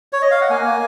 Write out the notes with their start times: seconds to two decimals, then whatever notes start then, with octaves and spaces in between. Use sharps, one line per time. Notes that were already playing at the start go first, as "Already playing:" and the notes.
0.13 C#5
0.22 D#5
0.31 F5
0.41 F#5
0.49 A#3 G#5
0.65 A#3